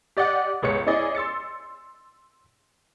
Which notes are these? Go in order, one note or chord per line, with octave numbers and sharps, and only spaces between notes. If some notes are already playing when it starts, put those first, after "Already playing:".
G4 D5 D#5 F#5
G1 C#2 G#3 C#5 C#7
C#4 E4 G#4 D5 D#5
C6 E6 A6 C#7